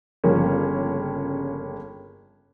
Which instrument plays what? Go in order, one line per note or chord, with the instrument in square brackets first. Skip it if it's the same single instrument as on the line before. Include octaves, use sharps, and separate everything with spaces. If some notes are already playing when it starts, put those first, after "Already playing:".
[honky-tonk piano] G1 C#3 F3 G3 A#3 C#4